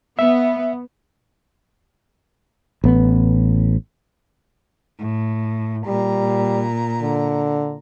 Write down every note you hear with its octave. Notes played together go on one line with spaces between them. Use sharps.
B3 E5
A1 B3
A2
A#2 G3 A#5
D3